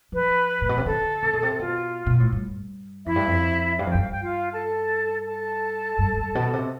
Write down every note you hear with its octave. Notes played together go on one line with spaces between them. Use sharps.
F3 B4
A2
B2
C3
D3 A4
C3
B2
C3
B2 F4
B2
A2
G2
F2 E4 E5
G2
F2
G2 F5
F2
G2 G5
F5
G5
F4 F5
A4 A5
A4 A5
G2
G2
B2
C3